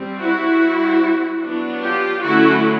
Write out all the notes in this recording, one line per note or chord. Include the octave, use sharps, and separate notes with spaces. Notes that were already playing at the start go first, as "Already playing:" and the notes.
Already playing: G3 C4
E4 F#4
G3 C4
F#3 B3 D4
F4 G4
D3 F#3 A3 C#4 E4 F#4